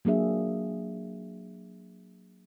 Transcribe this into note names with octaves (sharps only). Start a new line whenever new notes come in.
F#3 A#3 D4 G#4 E5